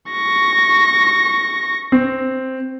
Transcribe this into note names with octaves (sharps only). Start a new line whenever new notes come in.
C#6 A#6
C4